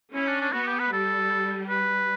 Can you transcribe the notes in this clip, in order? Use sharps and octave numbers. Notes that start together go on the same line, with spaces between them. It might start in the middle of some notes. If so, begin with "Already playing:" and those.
C#4 E4
D4
D4
B3 F#4
G4
B4
G3 A4
B4